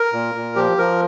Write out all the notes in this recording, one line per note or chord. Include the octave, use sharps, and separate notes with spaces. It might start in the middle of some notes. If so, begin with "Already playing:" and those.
Already playing: A#4
A#2
A#2
F3 G4
F3 A#4